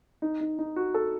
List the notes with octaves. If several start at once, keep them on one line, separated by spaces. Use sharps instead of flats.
D#4
D#4
D#4
F#4
A4